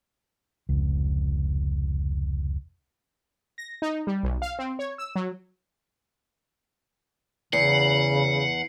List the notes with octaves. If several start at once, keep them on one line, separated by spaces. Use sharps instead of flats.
F1 C#2
A#6
D#4
G3
B1
F5
C4
C#5
E6
F#3
E2 C#3 F#5 C7